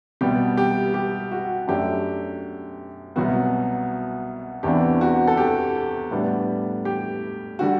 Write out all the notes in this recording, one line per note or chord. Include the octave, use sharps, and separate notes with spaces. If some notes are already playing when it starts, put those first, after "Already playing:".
C2 B2 G3 B3 G4
G4
G4
F#4
F#2 F#3 A3 D4 G4
C2 B2 F#3 B3 F#4
E2 C3 E3 B3 D4 G4
F#4
A4
G4
A2 G3 B3 D4
G4
D3 G3 F#4